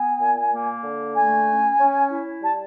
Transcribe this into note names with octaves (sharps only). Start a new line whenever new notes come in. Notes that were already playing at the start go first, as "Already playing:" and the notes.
Already playing: B3 G#5
A#2
A#3
D3
A3 G#5
C#4
C#4
E4
G3 A5